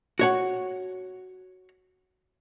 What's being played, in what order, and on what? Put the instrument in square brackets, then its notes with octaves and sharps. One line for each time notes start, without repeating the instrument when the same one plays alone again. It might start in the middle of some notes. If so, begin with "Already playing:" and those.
[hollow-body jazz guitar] F#4 C#5 F#5